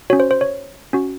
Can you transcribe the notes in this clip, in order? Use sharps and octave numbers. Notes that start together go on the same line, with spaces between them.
C#4 F#4 C#5
C5
C5
C#5
C#4 F#4